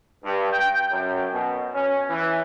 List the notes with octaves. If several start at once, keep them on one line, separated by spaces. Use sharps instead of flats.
G2
G5
F#2
B2
C#4
E3